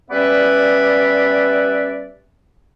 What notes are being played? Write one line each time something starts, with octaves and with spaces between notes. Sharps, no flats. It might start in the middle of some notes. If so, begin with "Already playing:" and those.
G3 B3 C#4 B4 D5 E5